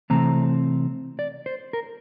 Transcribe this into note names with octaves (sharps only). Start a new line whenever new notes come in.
C3 E3 A3 C4 A#5
D5
C5
A#4